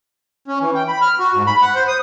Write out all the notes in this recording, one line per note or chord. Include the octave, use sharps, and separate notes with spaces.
C#4
E3
G5
B5
F6
F#4
G#2
B5
F#5
C5
D#6